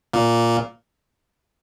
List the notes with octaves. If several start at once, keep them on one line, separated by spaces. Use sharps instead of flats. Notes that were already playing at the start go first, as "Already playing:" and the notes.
A#2 A#3